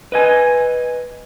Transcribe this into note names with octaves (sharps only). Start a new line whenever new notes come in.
B4 D#5 G#5